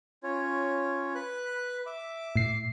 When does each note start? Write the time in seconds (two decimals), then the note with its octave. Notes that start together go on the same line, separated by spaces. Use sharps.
0.23 C#4 F4 C#5
1.15 B4 F#6
1.86 E5 D6
2.36 A2 C7